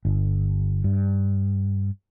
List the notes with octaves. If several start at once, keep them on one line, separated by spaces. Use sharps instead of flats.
G1
G2